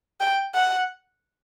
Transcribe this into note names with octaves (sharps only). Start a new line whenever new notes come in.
G5
F#5